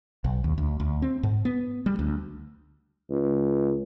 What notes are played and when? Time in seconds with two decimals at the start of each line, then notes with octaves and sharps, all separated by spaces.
0.24 B1
0.44 D#2
0.58 D2
0.80 D2
1.02 C4
1.23 G#2
1.45 B3
1.86 G3
1.99 D2
3.11 C#2